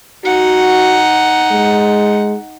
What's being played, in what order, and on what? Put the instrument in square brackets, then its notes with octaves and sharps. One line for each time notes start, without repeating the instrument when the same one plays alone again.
[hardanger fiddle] D#4 F#5 [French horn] F#4
[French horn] G#3